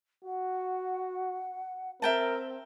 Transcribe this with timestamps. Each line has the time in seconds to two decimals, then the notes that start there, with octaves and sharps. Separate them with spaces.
0.25 F#4 F#5
2.02 C4 A#4 E5 G5 A5